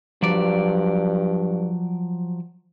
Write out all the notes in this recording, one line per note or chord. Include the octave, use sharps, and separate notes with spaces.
G2 F3 F#3 D5